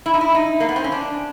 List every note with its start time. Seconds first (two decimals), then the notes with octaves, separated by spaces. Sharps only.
0.06 E4
0.14 D#4
0.21 E4
0.35 D#4
0.60 A#3
0.69 B3
0.76 C4
0.84 C#4
0.92 D4